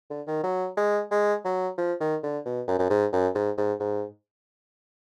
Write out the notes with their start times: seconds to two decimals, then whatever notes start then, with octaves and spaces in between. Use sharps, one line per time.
0.10 D3
0.27 D#3
0.44 F#3
0.77 G#3
1.11 G#3
1.45 F#3
1.78 F3
2.00 D#3
2.23 D3
2.46 B2
2.68 F#2
2.79 F#2
2.90 G#2
3.13 F#2
3.35 G#2
3.58 G#2
3.80 G#2